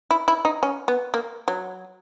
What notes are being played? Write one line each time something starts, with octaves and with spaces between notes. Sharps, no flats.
E4
E4
D#4
C#4
B3
A#3
F#3